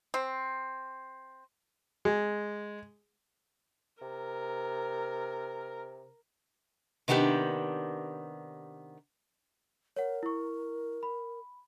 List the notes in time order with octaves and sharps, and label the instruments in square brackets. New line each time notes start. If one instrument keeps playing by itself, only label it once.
[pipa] C4
[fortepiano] G#3
[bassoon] C3 [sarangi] A#4
[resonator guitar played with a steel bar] C3 D#3 B3 D4 G4
[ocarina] A#4 [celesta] C#5 F#5
[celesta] E4 C#6
B5